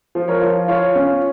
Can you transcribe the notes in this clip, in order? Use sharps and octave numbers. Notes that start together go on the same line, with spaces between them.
F3
A#4 C#5
F4
F4 C#5 F5
C#4